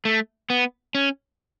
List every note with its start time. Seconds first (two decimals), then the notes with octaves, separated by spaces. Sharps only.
0.05 A3
0.50 B3
0.95 C#4